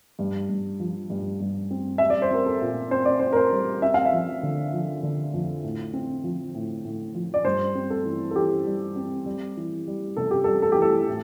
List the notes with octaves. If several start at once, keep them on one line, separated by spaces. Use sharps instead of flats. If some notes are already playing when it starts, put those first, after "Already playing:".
G2
G2
F3
G2
G2
C4
G3 E5
D5
C5
C4 A#4
A4
A#2
C4 C5
D5
C4 C5
A#4
C5
G3
C4 E5
F5
E5
F3
D3
F3
D3
F2
A2
C4
F3
A2
A2
F3
D5
G2 C5
C4
A4
E3
A4
E3 G4
G3
C4
G3
E3
G3
C3 A4
G4
G3 A4
A4
G4
E3 A4
A2